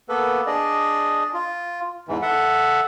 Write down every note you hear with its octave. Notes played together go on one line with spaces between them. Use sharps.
A#3 B3 A4 B4
D4 G#4 D5 D#5
F4
E2 G#2 E3
A4 E5 F#5